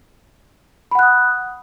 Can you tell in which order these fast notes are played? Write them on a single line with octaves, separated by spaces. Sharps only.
B5 F#5 F#6 D#6